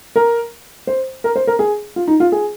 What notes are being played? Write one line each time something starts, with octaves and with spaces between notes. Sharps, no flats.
A#4
C5
A#4
C5
A#4
G#4
F4
D#4
F4
G#4